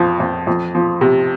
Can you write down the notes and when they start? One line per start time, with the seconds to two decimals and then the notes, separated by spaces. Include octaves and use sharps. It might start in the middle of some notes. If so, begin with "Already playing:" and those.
Already playing: F2 F3
0.20 F2
0.47 F2
0.75 F3
1.01 C3